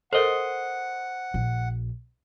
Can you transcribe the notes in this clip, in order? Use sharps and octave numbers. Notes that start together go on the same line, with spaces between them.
A4 A#4 C5 D#5 F#5
A#1